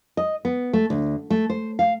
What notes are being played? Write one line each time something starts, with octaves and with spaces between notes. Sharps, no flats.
D#5
B3
A3
D2
A3
C5
F5